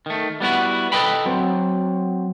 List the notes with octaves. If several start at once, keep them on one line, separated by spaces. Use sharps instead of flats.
D#3 A3
G3 B3 E4 F#4
A4 B4 C5 D#5 G5 B5
F#3 C4